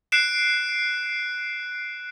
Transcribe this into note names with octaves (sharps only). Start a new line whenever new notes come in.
F#6 C7 D7 E7